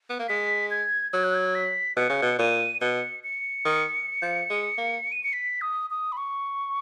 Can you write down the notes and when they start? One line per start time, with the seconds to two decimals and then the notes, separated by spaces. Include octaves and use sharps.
0.10 B3
0.19 A#3
0.28 G#3 B6
0.71 G#6
1.13 F#3 G#6
1.24 F#6
1.35 G#6
1.55 B6
1.96 B2 C#7
2.09 C#3
2.22 B2
2.39 A#2 D#7
2.81 B2 C#7
3.24 C#7
3.65 D#3
4.22 F3
4.50 G#3
4.78 A#3
5.12 D#7
5.24 C#7
5.33 B6
5.61 D#6
5.90 D#6
6.12 B5
6.17 C#6